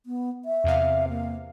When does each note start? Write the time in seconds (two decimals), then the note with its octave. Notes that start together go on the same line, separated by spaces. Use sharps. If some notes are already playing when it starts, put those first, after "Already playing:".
0.06 B3
0.45 E5
0.64 E2 C3 F5
1.09 A#3